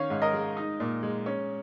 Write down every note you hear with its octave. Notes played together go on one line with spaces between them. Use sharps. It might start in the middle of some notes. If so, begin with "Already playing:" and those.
Already playing: D#3 C#4 C#5 F5
G#2
A#4 D#5
G#3
D#4
A#2
G#3
C#4